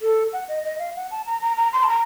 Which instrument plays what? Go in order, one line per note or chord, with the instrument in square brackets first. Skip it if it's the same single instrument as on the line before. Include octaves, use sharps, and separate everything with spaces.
[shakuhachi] A4
F#5
D#5
D#5
F5
F#5
A5
A#5
A#5
A#5
C6
A5
A#5